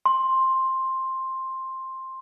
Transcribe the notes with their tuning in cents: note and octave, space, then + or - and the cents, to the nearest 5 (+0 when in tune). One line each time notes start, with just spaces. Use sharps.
C6 +10